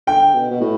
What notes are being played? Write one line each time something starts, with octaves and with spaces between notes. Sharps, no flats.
D3 G5
B2
B2
A2